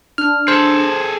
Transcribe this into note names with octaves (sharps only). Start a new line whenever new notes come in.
D4 F6
G#4 A4 C5